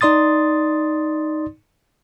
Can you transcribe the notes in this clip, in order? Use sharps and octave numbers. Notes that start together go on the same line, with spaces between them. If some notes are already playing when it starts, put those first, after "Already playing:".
D#4 D5 C6 D#6 A6